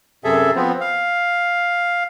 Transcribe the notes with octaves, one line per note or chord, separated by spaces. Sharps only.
F#2 C3 G#4 A4 E5
F3 B3 C4
F5